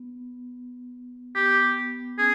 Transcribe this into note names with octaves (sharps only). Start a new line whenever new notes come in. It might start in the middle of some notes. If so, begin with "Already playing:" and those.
Already playing: B3
B3 G4
C#4 G#4